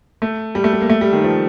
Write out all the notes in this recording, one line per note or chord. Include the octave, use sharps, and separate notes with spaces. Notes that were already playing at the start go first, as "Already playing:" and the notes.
A3
G3
A3
G3
A#3
A3
G3
D#3
F3